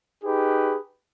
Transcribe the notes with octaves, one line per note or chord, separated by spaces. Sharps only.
D#4 G4 G#4 B4